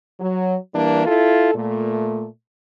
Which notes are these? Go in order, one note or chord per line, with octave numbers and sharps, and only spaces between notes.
F#3
E3 G3 A#3 D4
E4 F4 A4
A#2 A3